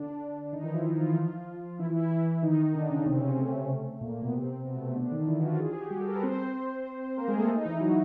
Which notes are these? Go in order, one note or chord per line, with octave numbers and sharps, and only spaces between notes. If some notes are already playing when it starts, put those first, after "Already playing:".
Already playing: D3 D4
D4
D#3 D#4
E3 E4
F3 F4
F3 F4
E3 E4
E3 E4
E3 E4
E3 E4
D#3 D#4
D3 D4
C#3 C#4
C3 C4
C#3 C#4
C3 C4
A3
A3
A#2 A#3
A#2 A#3
B2 B3
C3 C4
B2 B3
A3
D3 D4
D#3 D#4
E3 E4
F#4
F3 F4
G#4
G4
F#4
G3 G4
A4
A#4
B4
C4 C5
A#3 A#4
G#3 G#4
A3 A4
D#4
E3 E4
F#3 F#4